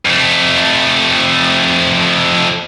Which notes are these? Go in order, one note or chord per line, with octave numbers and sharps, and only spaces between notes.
F2 A3